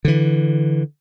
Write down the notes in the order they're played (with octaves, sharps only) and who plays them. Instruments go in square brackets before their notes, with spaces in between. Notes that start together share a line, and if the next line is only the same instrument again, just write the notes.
[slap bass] D3 E3